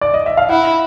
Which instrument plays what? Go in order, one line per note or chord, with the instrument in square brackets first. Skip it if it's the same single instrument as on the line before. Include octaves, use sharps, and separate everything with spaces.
[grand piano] D5
D#5
E5
F5
[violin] E4 [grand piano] F#5